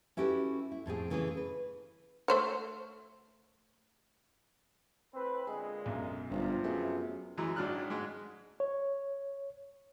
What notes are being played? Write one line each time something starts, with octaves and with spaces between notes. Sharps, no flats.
C#4 E4 F#4 G4 A4 B4
E4
F2 A2 C4 G#4
C#3 E3 A3 C#4 G#4
B4
A3 C5 C#5
A2 C4 B4
A#2 D3 G#3 G#4
B1 F#2
G1 C3 F3 F4
F#2 A3 B3 G#4
F#2 E3 F#3 G#3
G#1 G#2 F#3 D4 F6 F#6
G#2 G#3
C#5